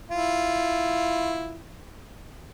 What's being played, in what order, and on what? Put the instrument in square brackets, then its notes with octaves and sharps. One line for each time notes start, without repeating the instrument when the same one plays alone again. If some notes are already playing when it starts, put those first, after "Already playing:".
[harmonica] E4 F4